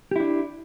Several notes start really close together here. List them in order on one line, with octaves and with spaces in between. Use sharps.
G4 E4 D4